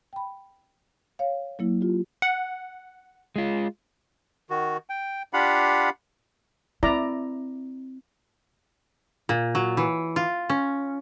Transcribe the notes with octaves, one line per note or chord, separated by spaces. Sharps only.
G5 B5
C#5 F5
F#3 A#3 E4
F4 G4
F#5
G#3 F4
D#3 F#4
G5
D4 F4 G4 F5 F#5 B5
C4 E4 D5 A#5
A#2
F#3
E3
F4
C#4